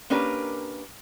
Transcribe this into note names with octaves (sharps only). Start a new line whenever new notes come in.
A#3 C#4 D4 G4 A#4 B4